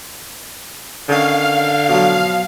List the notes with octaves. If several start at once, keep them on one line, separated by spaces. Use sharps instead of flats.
D3 D#3 C#4 F5
B2 F3 F#3